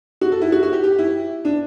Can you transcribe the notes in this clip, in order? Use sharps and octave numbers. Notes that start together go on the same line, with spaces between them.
F#4
A4
E4
F#4
F#4
G4
G4
E4
D4